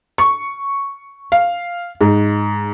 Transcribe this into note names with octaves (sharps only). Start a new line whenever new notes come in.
C#6
F5
G#2